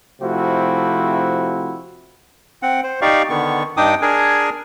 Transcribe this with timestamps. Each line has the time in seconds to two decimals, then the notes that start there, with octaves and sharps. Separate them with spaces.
0.21 C3 F3 A3 C4 E4 F#4
2.62 C4 F#5
2.84 C5
3.02 D#4 G4 D5 F5 C#6
3.29 D3 D#3 B3 C#6
3.77 G2 D4 D#4 G5 D6 D#6
4.02 D4 G#4 A#4 G#5